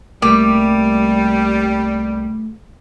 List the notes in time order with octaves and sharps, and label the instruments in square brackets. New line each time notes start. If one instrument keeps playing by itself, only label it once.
[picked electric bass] C2 A#3 [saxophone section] G3 [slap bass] A3 [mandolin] G4